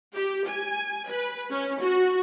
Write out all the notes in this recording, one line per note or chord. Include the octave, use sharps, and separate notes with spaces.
G4
G#5
B4
C#4
F#4